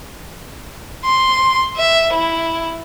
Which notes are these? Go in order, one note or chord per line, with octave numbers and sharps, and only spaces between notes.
C6
E5
E4